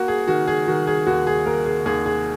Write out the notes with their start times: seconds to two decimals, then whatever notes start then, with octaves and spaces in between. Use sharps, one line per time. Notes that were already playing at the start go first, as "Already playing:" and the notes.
Already playing: A#3 F#4
0.08 G#4
0.28 D#3 F#4
0.48 G#4
0.67 D#3 F#4
0.87 G#4
1.06 D#2 F#4
1.27 G#4
1.46 A#3 A#4
1.66 G#4
1.86 D#2 G#4
2.06 G#4